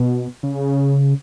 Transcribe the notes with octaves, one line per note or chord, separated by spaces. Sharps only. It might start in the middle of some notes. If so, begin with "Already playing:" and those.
Already playing: B2
C#3